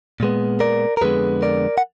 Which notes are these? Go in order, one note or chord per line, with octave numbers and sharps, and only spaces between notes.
A#2 G#3 B3
A#4 D5
A#4
F2 D3 G#3 B3 G#4 B4
A#4 D5
F#5